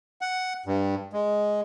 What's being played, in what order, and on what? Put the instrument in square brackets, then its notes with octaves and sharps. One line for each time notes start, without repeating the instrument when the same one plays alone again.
[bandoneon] F#5
G2
G#3